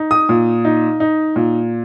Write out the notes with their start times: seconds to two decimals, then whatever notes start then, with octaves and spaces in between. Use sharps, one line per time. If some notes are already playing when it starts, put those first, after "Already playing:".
Already playing: D#4
0.11 D#6
0.29 A#2
0.65 D#4
1.00 D#4
1.36 A#2